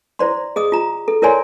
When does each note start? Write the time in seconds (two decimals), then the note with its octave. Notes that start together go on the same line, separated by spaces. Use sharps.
0.19 E4 C5 D5 C6
0.56 G#4 D#5 D#6
0.72 F4 A#5
1.08 A4
1.22 E4 A#4 C#5 D5 G#5 C6